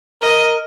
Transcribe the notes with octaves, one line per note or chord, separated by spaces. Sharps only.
A#4 D#5